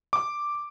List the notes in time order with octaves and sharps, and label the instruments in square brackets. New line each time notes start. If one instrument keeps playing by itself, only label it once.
[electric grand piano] D6